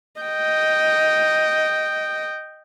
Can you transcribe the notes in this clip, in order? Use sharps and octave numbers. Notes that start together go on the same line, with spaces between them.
D#5 G5